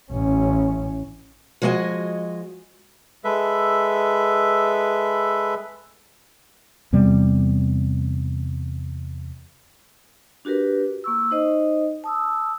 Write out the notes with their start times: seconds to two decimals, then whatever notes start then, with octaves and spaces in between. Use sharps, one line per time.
0.11 A1 C#4
1.62 F3 G#3 F#4 D#5 G#5
3.24 G#3 A4 B4 E5
6.93 E2 C3 G3 C4
10.45 D4 F#4 G4 A#4 B4
11.04 A#3 C#6 E6
11.31 D#4 C5 D#5
12.04 A5 D#6 E6